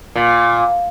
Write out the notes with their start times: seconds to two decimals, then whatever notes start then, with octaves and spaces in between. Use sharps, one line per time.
0.15 A#2